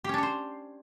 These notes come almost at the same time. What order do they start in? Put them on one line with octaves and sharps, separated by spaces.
G4 C#4 D4 C#5 C5